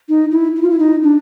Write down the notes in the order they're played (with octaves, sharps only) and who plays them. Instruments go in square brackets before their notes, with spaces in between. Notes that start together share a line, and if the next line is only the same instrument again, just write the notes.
[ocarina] D#4
E4
E4
F4
E4
D#4
D4